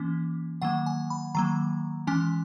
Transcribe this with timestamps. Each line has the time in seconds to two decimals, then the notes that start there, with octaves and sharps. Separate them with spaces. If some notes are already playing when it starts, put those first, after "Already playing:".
Already playing: E3 A#3 C#4
0.62 D#3 F#3 A#3 F#5
0.86 G#5
1.10 B5
1.35 D#3 F#3 A#3 A#5
2.07 E3 G#3 C#4 G#5